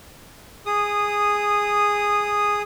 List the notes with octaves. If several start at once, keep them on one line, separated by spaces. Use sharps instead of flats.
G#4 D#6